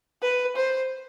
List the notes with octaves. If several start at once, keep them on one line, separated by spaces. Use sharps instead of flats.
B4
C5